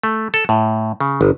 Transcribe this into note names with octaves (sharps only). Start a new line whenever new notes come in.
A3
A4
A2
C#3
G1